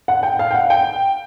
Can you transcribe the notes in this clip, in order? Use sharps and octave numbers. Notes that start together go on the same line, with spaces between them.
F#5
G5
F5
G5
F#5
G5